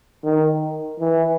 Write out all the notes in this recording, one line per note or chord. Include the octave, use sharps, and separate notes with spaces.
D#3
E3